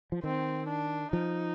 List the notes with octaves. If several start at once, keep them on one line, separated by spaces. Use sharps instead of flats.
F3
D#3 C4
D4
F3 D#4